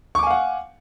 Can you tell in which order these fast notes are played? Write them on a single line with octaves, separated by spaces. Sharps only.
C#6 D6 G#5 F5 F#5